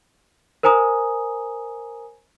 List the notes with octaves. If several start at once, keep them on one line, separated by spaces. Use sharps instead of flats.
A#4 C5 G#5 A#5 D#6